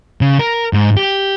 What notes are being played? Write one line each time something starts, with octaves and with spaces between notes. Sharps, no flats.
C#3
A#4
G#2
G4